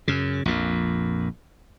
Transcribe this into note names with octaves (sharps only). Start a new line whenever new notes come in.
F#2 C#3
A#1 F2 A#2